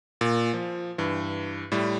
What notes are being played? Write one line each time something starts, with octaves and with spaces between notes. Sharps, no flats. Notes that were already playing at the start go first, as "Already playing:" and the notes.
A#2
F3
G2 E3
A2 G3